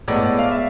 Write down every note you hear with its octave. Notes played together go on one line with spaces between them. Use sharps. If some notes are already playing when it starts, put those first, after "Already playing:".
A2 G#3 B3 D5
F5
E5